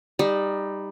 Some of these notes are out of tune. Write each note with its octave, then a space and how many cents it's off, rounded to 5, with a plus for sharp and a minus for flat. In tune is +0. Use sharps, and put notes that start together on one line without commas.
G3 +15 D#4 +0